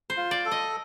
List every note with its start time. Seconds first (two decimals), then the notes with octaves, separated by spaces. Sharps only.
0.10 C5
0.17 F4
0.31 D5
0.46 A4
0.51 D#5